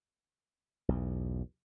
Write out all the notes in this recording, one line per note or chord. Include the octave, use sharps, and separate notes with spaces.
B1 E2